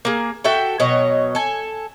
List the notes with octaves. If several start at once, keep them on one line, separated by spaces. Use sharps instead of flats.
A#3 G#4
F#4 A4 E5 G5
B2 F#3 C#5 D#5
A4 G#5